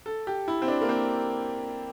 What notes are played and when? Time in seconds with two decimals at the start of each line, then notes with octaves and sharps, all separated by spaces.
0.06 A4
0.27 G4
0.48 E4
0.62 C4
0.68 D4
0.82 A#3
0.89 C4